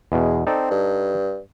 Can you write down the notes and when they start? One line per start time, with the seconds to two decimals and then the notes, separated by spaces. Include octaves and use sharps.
0.12 E2 B2 G#3
0.47 C4 D#4 A4 D5
0.71 G2